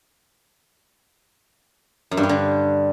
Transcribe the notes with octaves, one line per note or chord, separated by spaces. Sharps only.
F#2
G2
G3
D3